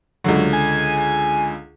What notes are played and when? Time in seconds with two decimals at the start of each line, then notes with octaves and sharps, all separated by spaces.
0.24 C#2 D3 F#3
0.53 G#5